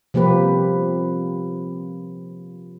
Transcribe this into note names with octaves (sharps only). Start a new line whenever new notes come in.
C3 F3 A#3 G4 B4